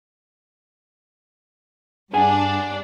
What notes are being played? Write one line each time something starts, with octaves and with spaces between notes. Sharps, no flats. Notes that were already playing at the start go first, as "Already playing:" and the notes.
G2 D4 G#4 F#5 G#5